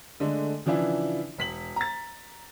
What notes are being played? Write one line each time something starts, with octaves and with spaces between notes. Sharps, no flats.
D3 G#3 A3 D4
C#3 E3 F3 D4 E4
E1 B6 F#7
A#5 A6